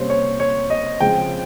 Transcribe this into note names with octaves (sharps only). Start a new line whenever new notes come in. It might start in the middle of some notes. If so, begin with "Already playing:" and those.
Already playing: C3 G3 A#3 C#4 C5
C#5
C#5
D#5
C#3 F3 G#3 C4 G5